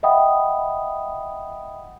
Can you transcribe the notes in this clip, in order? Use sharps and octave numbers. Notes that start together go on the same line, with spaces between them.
D#5 E5 F#5 G5 B5 D#6